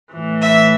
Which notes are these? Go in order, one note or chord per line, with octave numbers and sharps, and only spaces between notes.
A2 E3
E5